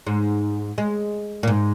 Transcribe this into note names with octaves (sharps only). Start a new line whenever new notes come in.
G#2
G#3
A#2
G#2